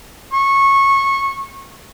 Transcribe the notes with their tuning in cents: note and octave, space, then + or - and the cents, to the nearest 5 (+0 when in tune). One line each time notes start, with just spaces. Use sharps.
C#6 -20